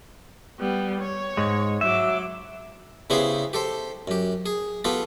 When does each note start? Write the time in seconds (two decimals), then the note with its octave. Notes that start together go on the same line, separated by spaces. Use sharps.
0.59 G3 B3
1.01 C#5
1.37 G#2 G#3
1.81 F#3 E5 D6
3.10 C#3 B3 E4 G4 G#4 C5
3.53 G4 A4 C5
4.08 F#2 G4
4.46 G#4
4.85 B3 F4 G4 A4